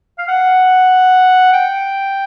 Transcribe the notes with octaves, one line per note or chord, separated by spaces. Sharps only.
F5
F#5
G5